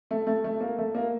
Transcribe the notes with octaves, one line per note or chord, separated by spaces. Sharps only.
A3
A3
A3
A#3
A3
A#3